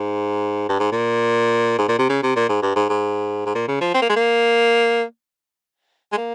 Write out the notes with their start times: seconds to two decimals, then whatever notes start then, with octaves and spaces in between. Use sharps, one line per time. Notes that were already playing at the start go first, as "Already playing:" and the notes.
Already playing: G#2
0.69 G2
0.79 G#2
0.92 A#2
1.78 G#2
1.88 A#2
1.99 C3
2.09 C#3
2.23 C3
2.36 A#2
2.49 G#2
2.62 G2
2.76 G#2
2.89 G#2
3.45 G#2
3.55 A#2
3.68 C#3
3.81 F3
3.94 C4
4.02 A#3
4.09 G#3
4.16 A#3
6.12 G#3
6.17 A#3